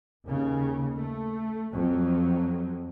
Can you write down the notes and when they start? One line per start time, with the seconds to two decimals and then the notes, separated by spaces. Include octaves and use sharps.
0.26 D#2 C#3
0.95 A3
1.73 F2 F#3